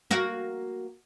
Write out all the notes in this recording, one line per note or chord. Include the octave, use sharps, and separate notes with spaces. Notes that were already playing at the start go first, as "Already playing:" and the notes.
A#3 F#4